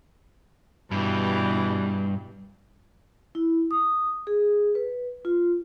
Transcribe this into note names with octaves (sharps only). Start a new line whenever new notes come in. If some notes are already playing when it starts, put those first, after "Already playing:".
G2 B2 E3 G3
E4
D#6
G#4
B4
F4